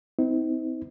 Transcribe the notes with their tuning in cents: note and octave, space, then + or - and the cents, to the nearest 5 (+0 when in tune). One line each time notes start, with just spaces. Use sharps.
C4 -30 D#4 +45